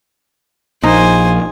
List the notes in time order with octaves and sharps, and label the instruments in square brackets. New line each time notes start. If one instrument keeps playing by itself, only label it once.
[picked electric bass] A#1 [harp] D#4 [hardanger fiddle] C5 G#5